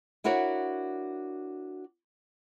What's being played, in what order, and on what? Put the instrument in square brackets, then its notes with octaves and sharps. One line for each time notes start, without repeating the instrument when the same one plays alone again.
[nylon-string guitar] D4 E4 F#4 A#4 C#5